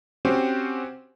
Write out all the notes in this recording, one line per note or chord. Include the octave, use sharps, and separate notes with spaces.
C4 C#4 F#4 G4 C5